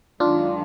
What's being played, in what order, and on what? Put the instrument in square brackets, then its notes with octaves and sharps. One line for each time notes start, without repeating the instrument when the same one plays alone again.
[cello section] F#2 D#3 G#3 [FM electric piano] D4 F4